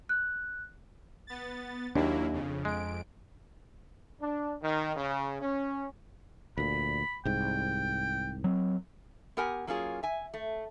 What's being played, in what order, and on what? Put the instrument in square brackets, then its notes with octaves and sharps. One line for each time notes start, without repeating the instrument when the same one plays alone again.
[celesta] F#6
[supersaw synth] B3 A6
[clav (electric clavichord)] D#2 [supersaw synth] F#3 A#3 E4 [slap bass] D4
[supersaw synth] F2 C#3
[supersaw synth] F2 D7 [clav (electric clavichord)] G#3
[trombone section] D4
D#3
C#3
C#4
[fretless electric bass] D2 A#2 [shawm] B5
[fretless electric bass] C2 G#2 [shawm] G5
[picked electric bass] F#3 C4
[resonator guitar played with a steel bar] B3 G4 A#4 F#5 G#5
F#3 A#3 C#4 F4 G#4
E5 G#5
A3